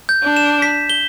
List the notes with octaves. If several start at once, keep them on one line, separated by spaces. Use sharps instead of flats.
G6
D4
E7
B6
G7